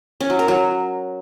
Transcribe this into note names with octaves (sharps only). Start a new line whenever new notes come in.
C#4
F#3
A#4
F#3